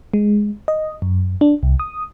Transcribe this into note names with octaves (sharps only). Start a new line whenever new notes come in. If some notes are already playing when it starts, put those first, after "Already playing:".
G#3
D#5
F#2
D4
C2
D#6